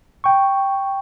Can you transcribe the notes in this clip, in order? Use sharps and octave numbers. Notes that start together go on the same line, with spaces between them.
G5 C#6